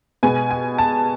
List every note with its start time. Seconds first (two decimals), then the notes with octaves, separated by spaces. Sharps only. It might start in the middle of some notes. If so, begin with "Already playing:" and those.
0.23 B2 G#3 B3 G#5
0.51 G#5
0.78 A5